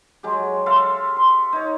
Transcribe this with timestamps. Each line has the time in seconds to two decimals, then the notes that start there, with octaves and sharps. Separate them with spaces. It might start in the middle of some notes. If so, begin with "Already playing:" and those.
0.23 F#3 G#3 G4
0.66 A4 E5 F5 C6
1.16 C6
1.53 D#4 C#5